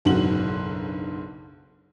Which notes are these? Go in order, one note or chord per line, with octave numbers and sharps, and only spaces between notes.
F#1 B1 G#2 D3 F#4 F#7